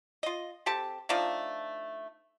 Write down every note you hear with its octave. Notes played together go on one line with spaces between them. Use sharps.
F4 D#5
C4 G4 A4 A5
F3 A3 D4 D#4